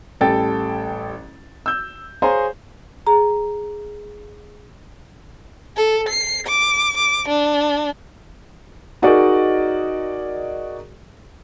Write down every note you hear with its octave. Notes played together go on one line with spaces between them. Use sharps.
A1 G3 A4 G5 A6
E6 G6
G#4 C5 C#5 F5 G#5 A#5
G#4 A#5
A4
C7
D6
D6
D4
D#4 F#4 G#4 A#4 D5 D#5